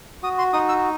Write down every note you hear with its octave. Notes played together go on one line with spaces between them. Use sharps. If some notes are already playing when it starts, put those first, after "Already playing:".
F#4 D#6
C6
D#4 D#6
E6